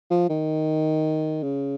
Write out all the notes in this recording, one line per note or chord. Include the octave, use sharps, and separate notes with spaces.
F3
D#3
C#3